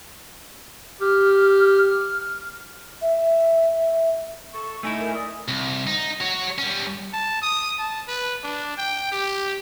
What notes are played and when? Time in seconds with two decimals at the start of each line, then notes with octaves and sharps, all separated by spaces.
1.01 G4 F6
3.02 E5
4.54 A4 C#6
4.83 A3 D#4 E4 G#5
5.00 A#4
5.14 D5 D#6
5.48 C2
5.87 D#4
6.20 F#4 C#5
6.58 G3 C#4
7.13 A5
7.42 D#6
7.79 A5
8.08 B4
8.43 D4
8.78 G5
9.12 G4